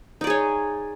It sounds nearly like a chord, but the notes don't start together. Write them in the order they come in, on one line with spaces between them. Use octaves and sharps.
D#4 D5 G#4 C#5